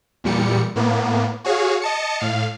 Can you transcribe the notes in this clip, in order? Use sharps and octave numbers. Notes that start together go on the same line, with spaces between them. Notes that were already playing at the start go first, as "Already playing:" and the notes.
E2 A#2 G3 C#7
A2 A#3 B3
F#4 G#4 C#5 F5
D#5 A5 C#7
A2 F5